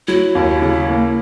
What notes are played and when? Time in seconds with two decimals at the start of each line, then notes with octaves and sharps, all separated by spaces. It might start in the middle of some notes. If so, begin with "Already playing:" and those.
0.08 F#3 E4
0.35 D#2
0.62 C#3
0.88 A#3